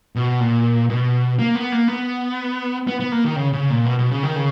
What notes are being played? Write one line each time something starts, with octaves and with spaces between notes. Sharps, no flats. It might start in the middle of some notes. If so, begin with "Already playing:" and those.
B2
A#2
B2
A#3
B3
A#3
B3
B3
B3
A#3
D#3
C#3
C#3
A#2
B2
B2
C#3
D#3
C#3